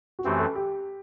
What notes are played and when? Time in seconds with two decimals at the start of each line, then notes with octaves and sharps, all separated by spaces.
0.19 F#4
0.25 F#2 E3 A3 C4 G4
0.39 A4
0.55 G4